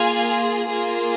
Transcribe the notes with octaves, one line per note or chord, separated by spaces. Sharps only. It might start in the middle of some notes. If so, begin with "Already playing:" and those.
Already playing: A#3 F4 G#4 F5 G#5
A#3 F4 G#4